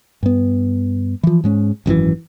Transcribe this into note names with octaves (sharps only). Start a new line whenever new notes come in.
G2 B3
E3 F3
G#2 G#3 C#4
G#1 F#2 A2 E3